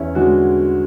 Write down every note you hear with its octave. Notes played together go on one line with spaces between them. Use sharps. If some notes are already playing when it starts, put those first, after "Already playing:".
Already playing: E2 C#4 E4
D3 G#3 D4 F#4